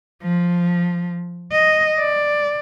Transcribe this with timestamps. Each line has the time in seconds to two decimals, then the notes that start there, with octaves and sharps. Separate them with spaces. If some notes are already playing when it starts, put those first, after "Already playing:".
0.23 F3
1.52 D#5
1.99 D5